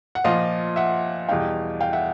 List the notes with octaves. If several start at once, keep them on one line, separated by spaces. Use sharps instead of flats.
F#5
A#2 F3 D#5 F5
E5 F#5
E2 B2 G3 F5 G5
F5 G5
E5 F#5